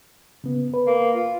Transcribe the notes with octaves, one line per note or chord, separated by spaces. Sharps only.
C#3 B3
B4
A#3
F4